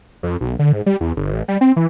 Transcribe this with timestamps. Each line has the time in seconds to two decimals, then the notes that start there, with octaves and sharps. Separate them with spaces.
0.23 F2
0.41 B1
0.59 D3
0.73 G#2
0.86 G3
1.00 E2
1.16 G1
1.32 A1
1.48 G3
1.61 C4
1.76 E3